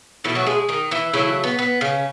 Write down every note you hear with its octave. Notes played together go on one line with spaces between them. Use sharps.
B2 E3 A3 E4
F#3 F#4
G#3 G#4
D#3 D#4
E3 E4
C#3 E3 F#3 A3 E4
B3
B3
C#3 C#4